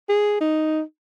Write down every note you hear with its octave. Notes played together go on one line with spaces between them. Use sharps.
G#4
D#4